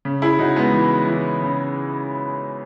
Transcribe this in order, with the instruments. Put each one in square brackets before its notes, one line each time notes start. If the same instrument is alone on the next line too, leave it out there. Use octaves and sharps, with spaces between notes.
[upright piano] C#3
E4 G#4
C#3 D#4 F#4
G#3 B3
E3
E3
C#3